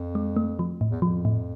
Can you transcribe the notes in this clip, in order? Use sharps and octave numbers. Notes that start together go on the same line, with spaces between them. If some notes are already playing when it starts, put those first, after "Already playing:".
Already playing: F2
G#3
A3
F3
A2
E2
F2 F3
A2